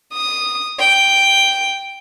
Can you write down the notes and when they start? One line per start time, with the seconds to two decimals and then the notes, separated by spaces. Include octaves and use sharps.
0.14 D#6
0.79 G5